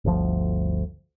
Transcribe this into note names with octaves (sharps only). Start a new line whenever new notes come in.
G1 D2 F3